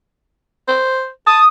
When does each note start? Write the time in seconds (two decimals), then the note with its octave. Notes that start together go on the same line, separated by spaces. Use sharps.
0.68 C5
1.27 A5 D#6